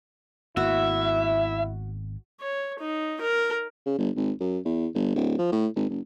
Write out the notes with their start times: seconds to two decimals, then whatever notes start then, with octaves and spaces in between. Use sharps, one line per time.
0.57 G#1 A#3 B3 E4 F#4 E5
2.41 C#5
2.79 D#4
3.21 A#4
3.86 C#3
3.98 G1
4.16 G#1
4.40 F#2
4.65 E2
4.95 G1
5.15 D1
5.38 F3
5.52 A2
5.76 G#1
5.89 F#1